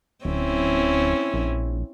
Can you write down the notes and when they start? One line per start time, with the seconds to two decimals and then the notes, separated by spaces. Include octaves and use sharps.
0.25 D1 C4 C#4 E4
1.34 A#1